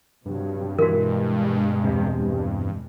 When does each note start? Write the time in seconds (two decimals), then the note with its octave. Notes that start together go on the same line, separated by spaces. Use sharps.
0.26 G2 C3 F#3
0.79 B2 E3 G#3 F#4 A#4
1.84 E2 C3
2.19 G2